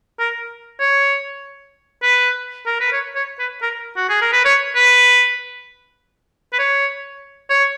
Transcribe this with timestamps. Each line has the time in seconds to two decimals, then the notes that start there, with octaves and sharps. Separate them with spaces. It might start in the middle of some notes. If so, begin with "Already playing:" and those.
0.20 A#4
0.80 C#5
2.03 B4
2.67 A#4
2.81 B4
2.93 C#5
3.16 C#5
3.40 B4
3.63 A#4
3.97 F#4
4.09 G#4
4.22 A#4
4.33 B4
4.46 C#5
4.76 B4
6.53 B4
6.59 C#5
7.50 C#5